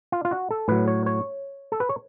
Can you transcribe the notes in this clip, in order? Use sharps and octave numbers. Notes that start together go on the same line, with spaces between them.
F4
F4
F#4
A4
A2 F#3 B4
C#5
C#5
A4
B4
C#5